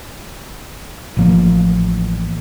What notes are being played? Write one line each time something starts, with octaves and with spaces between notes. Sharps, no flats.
A1 F3 A#3